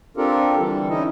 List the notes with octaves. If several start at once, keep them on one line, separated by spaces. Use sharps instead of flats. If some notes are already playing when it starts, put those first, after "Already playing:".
C4 D4 F4 G4 A4 A#4
D3 E3 G3 A4
C#4 D#4 E4 D#5